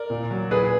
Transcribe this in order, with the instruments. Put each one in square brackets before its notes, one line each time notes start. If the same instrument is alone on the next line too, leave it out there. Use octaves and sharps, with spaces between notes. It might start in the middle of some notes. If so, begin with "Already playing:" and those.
Already playing: [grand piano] A#4 D5
A#2
F#3
A#2 G#4 B4